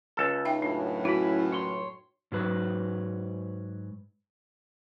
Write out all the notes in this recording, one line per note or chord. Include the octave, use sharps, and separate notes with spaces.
C#2 A4
D#4 E5 G5
F#2 A2 D4
E4 F#4 B5
C#5 C6
G#2 F#3 B4